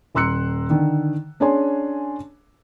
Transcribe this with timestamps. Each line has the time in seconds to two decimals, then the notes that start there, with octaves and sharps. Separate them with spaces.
0.15 D#1 A#5 C6 E6 F#6 C#7
0.70 D3 D#3
1.40 C#4 D4 G#4 C#5 G#5 C6